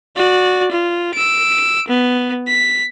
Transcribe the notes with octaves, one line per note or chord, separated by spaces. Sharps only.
F#4 D5
F4
E6 D7
B3
B6